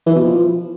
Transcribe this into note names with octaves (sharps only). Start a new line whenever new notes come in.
E3
B2
F3